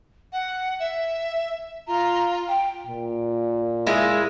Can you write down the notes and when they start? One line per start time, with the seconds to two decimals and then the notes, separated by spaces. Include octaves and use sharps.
0.33 F#5
0.80 E5
1.88 F4 A#5
2.49 G5
2.87 A#2
3.86 G#3 E4 F4